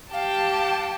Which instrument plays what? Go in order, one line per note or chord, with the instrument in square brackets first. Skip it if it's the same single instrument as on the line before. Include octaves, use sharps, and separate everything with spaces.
[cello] G4 G5 [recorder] F5 [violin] A5